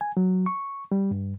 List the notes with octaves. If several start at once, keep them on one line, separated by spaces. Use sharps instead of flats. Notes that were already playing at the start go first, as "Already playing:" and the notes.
G#5
F#3
C#6
G3
G2